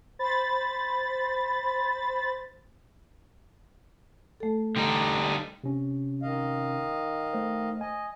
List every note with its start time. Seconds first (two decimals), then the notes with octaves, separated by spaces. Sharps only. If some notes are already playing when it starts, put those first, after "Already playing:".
0.19 C5 B5 A6
4.40 A3 A4
4.76 D3 G3 D#4
5.64 C3 C#4
6.23 D#3 D#5 F5
7.33 A3 C5
7.81 D#5 G#5